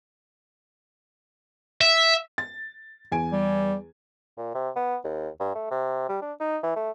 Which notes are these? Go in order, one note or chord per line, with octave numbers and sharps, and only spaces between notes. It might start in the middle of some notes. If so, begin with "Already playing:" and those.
E5
A6
E2 G#5 D7
G3
A#2
C3
B3
D#2
G2
A3
C3
G3
D4
D#4
E3
A3